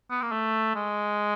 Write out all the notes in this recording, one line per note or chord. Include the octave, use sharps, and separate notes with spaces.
B3
A#3
A3
G#3